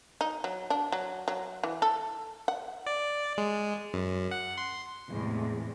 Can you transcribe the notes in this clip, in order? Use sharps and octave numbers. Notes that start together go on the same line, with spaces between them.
D#4
F#3
D4
F#3
F#3
E3
A4
F#5
D5
G#3
F#2
F#5
C6
E2 A2 C3 G#3